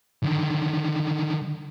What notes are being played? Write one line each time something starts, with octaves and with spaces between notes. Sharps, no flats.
D3 D#3